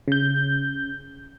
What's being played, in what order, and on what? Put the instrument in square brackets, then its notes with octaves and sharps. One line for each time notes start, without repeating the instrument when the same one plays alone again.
[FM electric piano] C#3 G6